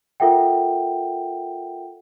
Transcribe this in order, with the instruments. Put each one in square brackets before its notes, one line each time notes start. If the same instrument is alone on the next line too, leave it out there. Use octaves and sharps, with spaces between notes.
[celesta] F4 A4 A#4 E5 F#5 G5